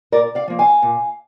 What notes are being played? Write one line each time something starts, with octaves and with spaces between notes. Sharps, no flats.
A#2 A#4 D5
D5 F5
F3 A#3
F5 G#5
A#2